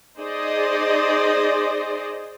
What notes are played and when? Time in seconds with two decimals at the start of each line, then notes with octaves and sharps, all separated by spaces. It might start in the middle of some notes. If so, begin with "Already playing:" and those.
0.18 D#4 G#4 C5 D5 D#5